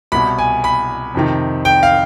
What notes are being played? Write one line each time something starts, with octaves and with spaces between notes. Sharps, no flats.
C2 B2 B5
G#5
B5
F2 C3 D#3
G5
F5